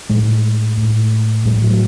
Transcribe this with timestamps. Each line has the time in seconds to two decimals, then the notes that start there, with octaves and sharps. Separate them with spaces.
0.10 A2 G#3
0.78 A2
1.45 A2 G3
1.62 F#3